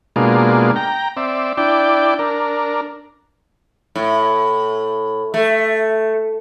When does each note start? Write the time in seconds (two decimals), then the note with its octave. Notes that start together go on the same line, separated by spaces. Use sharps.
0.16 B2 G#3 A#3 D4 F4
0.76 G5 A#5
1.17 C4 D5 E5
1.57 D4 E4 D5 G5
2.19 D4 A#4
3.95 A2
5.34 A3